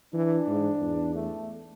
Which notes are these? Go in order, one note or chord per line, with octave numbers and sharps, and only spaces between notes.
E3 D4
G#2
E2
A3